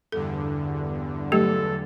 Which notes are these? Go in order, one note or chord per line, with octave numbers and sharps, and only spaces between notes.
E2 G2 D3 A4
F#3 A3 G4 A4